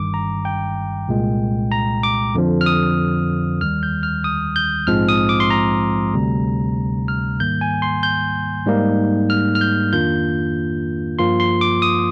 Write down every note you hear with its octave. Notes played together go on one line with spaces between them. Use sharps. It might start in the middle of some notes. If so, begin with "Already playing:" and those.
Already playing: G1 G2 D#3 G3 D6
A#5
G5
C2 A#2 G#3
A#5
D6
F2 D3 F3
F6
D#6
D#2 D#3 G3 F6
G6
F6
D#6
G6
A#1 G#2 F3 G#3 C4 F6
D#6
D6
C6
A#5
D2 C3 G3
F6
G#2 D#3 G3 A#3 G6
G#5
C6
G6
G#2 G3 A#3 D#4
F6
F6
G6
F2 D#3 A#3 D4 F4 G6
G2 F3 A#3 F4 C6
C6
D6
D#6